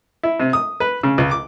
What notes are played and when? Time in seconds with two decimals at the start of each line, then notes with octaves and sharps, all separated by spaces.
0.23 E4
0.40 C3
0.53 D#6
0.80 B4
1.03 C#3
1.18 C#2
1.31 D6